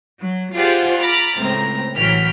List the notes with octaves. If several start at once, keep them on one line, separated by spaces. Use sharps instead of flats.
F#3
F4 G4 G#4 C5 D5 F#5
A#5 B5 D6 F6 A6
C#2 A2 C4 A#5
A1 E3 F#3 G5 F6 B6